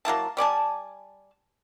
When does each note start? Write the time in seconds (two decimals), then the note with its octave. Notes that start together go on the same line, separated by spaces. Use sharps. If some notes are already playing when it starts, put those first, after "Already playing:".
0.05 F#3 A#3 E4 A5
0.37 G3 D5 G#5 A5